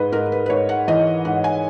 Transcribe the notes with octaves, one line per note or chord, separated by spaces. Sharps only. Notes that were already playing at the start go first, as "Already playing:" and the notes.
Already playing: G#2 B4 D#5
G#2 A#4
A#4
B4
B4
G#2 C#5
F#5
E3 D#5
G#2 F#5
G#5